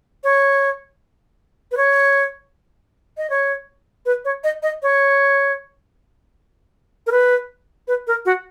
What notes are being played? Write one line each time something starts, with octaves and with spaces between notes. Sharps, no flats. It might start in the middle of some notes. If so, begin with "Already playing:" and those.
C#5
B4
C#5
D#5
C#5
B4
C#5
D#5
D#5
C#5
A#4
B4
B4
A#4
F#4